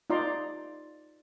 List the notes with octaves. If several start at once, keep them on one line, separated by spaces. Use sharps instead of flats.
D#4 F4 D5 A#5 C6